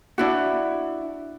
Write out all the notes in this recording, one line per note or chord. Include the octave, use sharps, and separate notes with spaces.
D4 E4 F#4